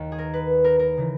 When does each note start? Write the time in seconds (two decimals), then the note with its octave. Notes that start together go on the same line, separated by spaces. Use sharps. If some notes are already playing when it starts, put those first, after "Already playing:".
Already playing: D#2 D#3
0.12 G#4
0.18 A#4
0.34 B4
0.64 A#4
0.79 A#4
0.97 C#3 E3